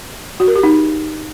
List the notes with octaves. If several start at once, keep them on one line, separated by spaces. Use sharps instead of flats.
F#4
A#4
G4
D#4